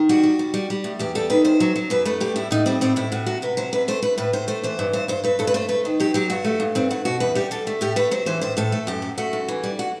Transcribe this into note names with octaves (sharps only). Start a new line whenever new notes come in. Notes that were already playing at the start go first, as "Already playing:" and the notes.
Already playing: D#3
G3 F#4
G3
G3
G3
G3
A2
E2 G4
G3 A4
D#3 B4
E2 C5
F#3
F#3
F#2 B4
A3 B4
G3 G4
A2 E4
A2 D#4
G3 C4
A2 C4
A2 E4
A2 F#4
F#3 F#4
C3 B4
F#3 C5
C3 B4
A3 C5
A3 B4
A2 B4
A2 C5
A3 C5
E3 C5
G2
G2 C5
G2 C5
G2 B4
G2 A4
B4
A3 C5
A3 B4
D#3
F#3 G4
F#3 G4
G2 F#4
A3
G2
G2 C4
G2 F#4
B2 F#4
E2 B4
G3 G4
G3 A4
A3
A2 G4
A3 B4
F#3 C5
E3 C5
A2 C5
A2 A4
A3
F#2 G4
F#3
A3 F#4
F#2
E3
G3
F#4